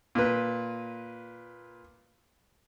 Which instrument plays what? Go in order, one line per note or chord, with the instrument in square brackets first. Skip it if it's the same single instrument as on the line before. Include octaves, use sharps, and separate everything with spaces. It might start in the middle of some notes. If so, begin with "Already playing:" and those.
[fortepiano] A#2 B4